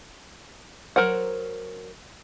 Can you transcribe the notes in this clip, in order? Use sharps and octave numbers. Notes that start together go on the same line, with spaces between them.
F#3 D4 A#4 C5 F#5